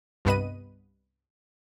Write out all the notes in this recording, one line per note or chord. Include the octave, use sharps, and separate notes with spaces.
C2 G2 B3 B4 D#5 D#7